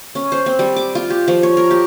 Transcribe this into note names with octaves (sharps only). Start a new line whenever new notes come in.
C#4
C5
C4
G3
D6
F4
G4
F3
C#5
A#4
G4